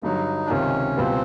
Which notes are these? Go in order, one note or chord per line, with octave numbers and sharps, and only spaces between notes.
G2 D3 F#3 D#4
D4
C#2 C3 D#3 C#4
C#2 B2 G3 B3 C4